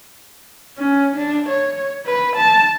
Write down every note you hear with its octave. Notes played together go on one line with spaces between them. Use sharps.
C#4
D4
C#5
B4
A5